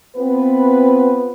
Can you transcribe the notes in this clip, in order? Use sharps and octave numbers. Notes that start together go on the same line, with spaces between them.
B3 C4 F4 B4